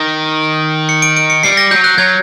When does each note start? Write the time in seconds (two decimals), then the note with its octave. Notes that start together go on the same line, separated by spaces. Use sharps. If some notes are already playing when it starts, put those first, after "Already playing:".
Already playing: D#3 A#6
0.89 C#7
1.02 D7
1.17 D7
1.30 C#7
1.43 G3 C7
1.57 A#6
1.71 F#3 G6
1.84 F#6
1.98 F#3 G#6